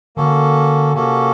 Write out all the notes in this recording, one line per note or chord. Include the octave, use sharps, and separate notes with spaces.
D3 A#3 C#4 F#4 A4
C3 A#3 C#4 F#4 A4